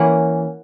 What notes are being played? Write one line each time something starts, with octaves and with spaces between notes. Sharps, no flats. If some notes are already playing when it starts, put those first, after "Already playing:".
Already playing: E3 A#3 C#4 F#5